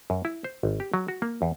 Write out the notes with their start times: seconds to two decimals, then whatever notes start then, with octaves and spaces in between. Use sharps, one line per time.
0.10 F#2
0.25 E4
0.44 C5
0.63 G#1
0.80 G4
0.94 F#3
1.08 F#4
1.22 A#3
1.42 E2